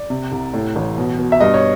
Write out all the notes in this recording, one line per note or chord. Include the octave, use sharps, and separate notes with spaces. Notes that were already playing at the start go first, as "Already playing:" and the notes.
Already playing: D5
C3
C2
A2
A1
B2
B2
E5
G2 D#5
C#5